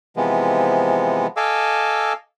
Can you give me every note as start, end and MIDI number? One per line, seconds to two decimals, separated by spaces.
0.17 1.27 48
0.17 1.27 52
0.17 1.27 53
0.17 1.27 56
0.17 1.27 59
1.37 2.13 69
1.37 2.13 75
1.37 2.13 77
1.37 2.13 80
1.37 2.13 86
1.37 2.13 88